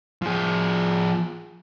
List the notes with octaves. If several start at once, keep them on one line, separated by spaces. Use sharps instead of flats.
F3 G#4